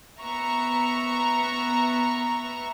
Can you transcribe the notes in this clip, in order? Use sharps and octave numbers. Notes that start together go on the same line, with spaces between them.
B3 E5 A#5 C#6